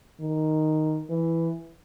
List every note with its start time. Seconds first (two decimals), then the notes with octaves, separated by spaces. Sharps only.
0.21 D#3
1.10 E3